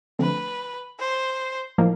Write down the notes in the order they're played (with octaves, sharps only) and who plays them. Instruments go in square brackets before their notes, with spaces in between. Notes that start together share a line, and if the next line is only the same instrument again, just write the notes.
[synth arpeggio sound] D3 F3 A3 C4 [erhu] B4
[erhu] C5
[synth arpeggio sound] A2 F3 A#3 D#4